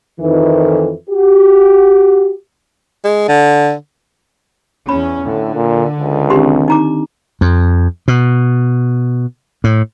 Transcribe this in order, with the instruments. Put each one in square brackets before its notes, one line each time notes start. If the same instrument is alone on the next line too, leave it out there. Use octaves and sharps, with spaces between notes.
[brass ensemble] F2 D#3 E3
F#4 G4
[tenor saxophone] G#3
D3
[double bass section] E2 C#4 [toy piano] B5
[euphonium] A2 [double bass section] D3
[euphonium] A#2
C#2
[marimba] D#3 C4 D4 [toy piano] G4 C6
[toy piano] D#4 A#5 D6
[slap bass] F2
B2
A2